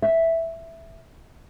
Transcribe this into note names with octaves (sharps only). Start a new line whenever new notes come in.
E5